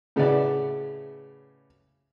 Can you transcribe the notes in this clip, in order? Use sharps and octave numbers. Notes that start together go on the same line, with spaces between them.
A2 C#3 F#4 B4 D5 E5